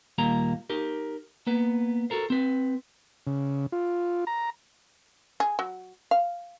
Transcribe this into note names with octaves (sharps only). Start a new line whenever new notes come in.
D#2 A#2 G3 A#3 A#5
D#4 G4 A#4
A#3 B3 B4
F#4 A4 A#4 C5
C4 B4
C#3
F4
A#5
G#4
F#3
F5